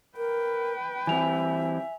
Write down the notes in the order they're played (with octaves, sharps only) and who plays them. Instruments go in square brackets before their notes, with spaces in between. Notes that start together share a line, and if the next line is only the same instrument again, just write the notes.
[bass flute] A#4 [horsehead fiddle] B4 G5
[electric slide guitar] E3 G3 C4 [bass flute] E5 [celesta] G#5 F7